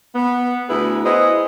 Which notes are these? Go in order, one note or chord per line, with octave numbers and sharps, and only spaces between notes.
B3
D2 E4 G#4 B4
B3 E4 G#4 C5 D#5